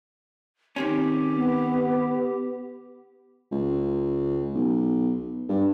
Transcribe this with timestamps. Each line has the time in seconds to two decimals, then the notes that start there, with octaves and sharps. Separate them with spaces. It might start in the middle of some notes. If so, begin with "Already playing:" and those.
0.76 D#3 C4 C#4 G4
1.34 B3
3.51 C#2
4.54 B1
5.49 G2